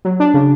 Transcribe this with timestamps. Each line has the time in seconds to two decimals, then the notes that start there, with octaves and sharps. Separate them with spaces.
0.05 F#3
0.20 D4
0.34 C#3